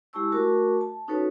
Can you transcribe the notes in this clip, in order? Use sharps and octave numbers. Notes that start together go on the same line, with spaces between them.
G#3 E4 G4 A5 C#6 E6
A3 F#4 A#4 A5 C#6 D6
A5
C#4 D#4 F#4 A4 B4 C#5